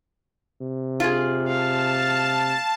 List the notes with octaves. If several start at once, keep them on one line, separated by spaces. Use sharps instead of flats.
C3
F4 G#4
F5 A5